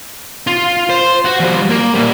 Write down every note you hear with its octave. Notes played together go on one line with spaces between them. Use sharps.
F4
C5
F#4 F#5
F3 G3
A#3
A#2 G3